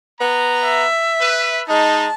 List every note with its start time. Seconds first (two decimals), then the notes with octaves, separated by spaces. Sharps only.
0.19 B3 A#5
0.65 E5
1.21 B4
1.68 G#3 D#4 A5